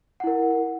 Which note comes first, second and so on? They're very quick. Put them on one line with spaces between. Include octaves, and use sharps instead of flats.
F#5 E4 A#4